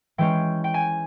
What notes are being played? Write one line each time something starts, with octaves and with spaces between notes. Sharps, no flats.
E3 G#3 C#4 G5
G5
G#5